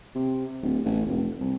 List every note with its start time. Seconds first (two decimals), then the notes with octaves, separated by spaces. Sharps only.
0.15 C3
0.62 D1
0.85 A1
1.06 F1
1.40 C2